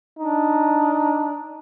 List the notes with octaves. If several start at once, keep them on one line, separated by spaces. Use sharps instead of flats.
D4 D#4